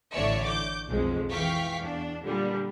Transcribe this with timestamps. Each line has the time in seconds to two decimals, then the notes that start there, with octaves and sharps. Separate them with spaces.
0.12 A1 D3 C#5 D5 E5 C#7
0.45 D6 G6
0.88 B1 F2 G#3
1.32 E3 F5 G5 C#6 B6
1.79 E2 D4
2.23 A#2 D3 G3